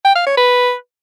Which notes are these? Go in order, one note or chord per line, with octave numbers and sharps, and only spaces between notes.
G5
F5
C#5
B4